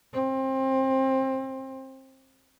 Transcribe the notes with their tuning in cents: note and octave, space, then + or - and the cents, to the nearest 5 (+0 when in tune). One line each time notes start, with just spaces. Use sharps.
C4 +25